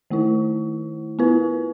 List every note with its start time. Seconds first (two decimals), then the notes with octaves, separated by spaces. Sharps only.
0.10 D#3 A3 E4
1.19 B3 E4 B4